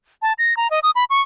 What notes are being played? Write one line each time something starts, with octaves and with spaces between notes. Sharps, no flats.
A5
A#6
A#5
D#5
D#6
B5
C#6